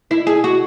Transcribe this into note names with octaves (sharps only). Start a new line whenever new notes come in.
E4
G#4
F#4